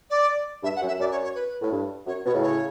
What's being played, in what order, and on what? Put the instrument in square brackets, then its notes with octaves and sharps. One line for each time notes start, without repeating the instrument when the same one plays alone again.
[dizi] D5
[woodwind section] G2 [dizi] E5
[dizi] F#5
[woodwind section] F#2
[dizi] E5
[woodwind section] F#2 [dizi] D5
[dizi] C#5
C#5
B4
[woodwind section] A2
G2
[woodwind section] F#2 [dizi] C#5
[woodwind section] B2 [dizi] C#5
[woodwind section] A2 C#3
[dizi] C#5